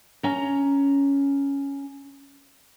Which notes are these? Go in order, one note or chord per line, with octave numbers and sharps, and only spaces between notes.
C#4 A#5